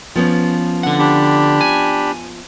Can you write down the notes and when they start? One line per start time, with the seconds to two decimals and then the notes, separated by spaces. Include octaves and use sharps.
0.15 F3 B3 C#4
0.83 D3 F#5
0.99 D4 G4 B5
1.61 G#5